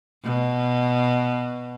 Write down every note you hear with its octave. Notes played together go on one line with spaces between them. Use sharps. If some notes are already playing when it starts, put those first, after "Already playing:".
B2